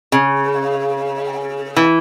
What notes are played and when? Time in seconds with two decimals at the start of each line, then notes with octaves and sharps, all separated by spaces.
0.12 C#3
1.76 E3